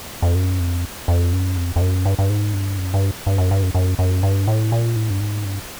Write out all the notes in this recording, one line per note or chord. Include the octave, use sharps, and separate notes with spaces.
F2
F#2
F2
F2
F#2
F2
F2
F#2
G2
G2
G#2
G2
F#2
G2
G2
F#2
G2
F#2
F#2
F#2
G2
A2
A#2
A2
G2
G#2
G2